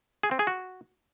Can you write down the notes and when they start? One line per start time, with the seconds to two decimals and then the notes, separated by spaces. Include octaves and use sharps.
0.23 G#4
0.31 C4
0.39 G#4
0.47 F#4